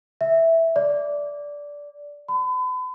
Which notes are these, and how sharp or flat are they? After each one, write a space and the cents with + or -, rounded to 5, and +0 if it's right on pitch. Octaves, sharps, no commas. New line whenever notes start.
E5 -5
D5 -15
B5 +40